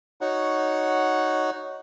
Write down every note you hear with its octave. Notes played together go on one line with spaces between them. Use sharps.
D#4 F#4 C#5 F#5